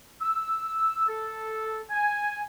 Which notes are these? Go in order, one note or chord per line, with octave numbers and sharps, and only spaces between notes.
E6
A4
G#5